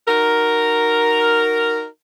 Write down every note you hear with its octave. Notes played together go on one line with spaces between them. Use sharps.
D#4 F#4 A#4